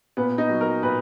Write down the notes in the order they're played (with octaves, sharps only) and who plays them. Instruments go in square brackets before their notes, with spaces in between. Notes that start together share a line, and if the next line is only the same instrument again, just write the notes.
[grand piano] A#2 B3
D#4
F#3
A#4
A#2 B4